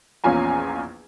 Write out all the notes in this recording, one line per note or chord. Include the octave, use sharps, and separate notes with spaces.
A#1 E2 C#4 F4 G#5 A#5